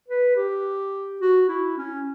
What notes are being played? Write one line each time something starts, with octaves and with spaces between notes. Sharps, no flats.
B4
G4
F#4
E4
C#4